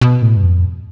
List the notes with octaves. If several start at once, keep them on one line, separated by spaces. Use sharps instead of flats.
B2
A2
G2
F2